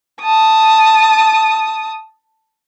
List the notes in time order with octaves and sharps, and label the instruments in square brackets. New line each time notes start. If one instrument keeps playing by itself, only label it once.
[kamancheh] A5 D#6